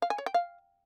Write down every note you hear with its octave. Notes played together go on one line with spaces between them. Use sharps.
F5
G#5
C#5
G5
F5